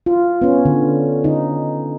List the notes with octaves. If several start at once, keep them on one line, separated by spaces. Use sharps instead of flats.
F4
B3 C#4
D3
D3 D#4